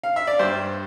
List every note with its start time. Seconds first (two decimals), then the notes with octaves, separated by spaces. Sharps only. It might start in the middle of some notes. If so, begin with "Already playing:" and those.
0.03 F5
0.16 E5
0.27 D5
0.39 G2 C5